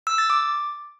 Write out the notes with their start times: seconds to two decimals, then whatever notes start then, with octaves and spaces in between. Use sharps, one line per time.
0.07 E6
0.18 A6
0.30 D6